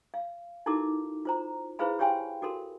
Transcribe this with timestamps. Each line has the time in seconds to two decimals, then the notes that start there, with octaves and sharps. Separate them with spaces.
0.14 F5
0.66 D#4 E4 F#4 A4 A#4 D6
1.25 F4 C5 A#5
1.79 E4 G#4 B4 C5 F5 B5
1.99 G4 C#5 F5 G5 G#5 C6
2.42 F#4 A4 A#4 C6